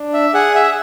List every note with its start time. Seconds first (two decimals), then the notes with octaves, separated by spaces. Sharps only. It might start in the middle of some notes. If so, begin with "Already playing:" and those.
Already playing: D4
0.13 E5
0.34 G#4 F#5
0.55 E5